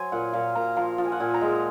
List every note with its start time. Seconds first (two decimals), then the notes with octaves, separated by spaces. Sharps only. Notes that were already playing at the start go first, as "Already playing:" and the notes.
Already playing: F#3 C5 G#5
0.12 A#2 F#5
0.33 A#2 F5
0.55 A#2 A#5
0.77 F3 A#5
0.98 F3
1.05 G#5
1.12 F#5
1.20 A#2 G#5
1.34 A#5
1.41 G#3